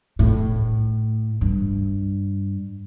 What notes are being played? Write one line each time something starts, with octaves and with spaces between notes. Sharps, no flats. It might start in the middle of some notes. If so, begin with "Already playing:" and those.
A2
G2